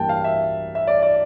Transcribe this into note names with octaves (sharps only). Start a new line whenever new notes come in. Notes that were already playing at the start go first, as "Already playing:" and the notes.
Already playing: G2 E3 A#3 G5 A5
F5
E5
E5
D5
D5